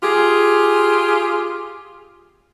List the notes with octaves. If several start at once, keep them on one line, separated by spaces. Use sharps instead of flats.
F4 G4 G#4